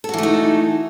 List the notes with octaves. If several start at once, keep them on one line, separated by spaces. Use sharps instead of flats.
E3 A3 D#4 F#4 A4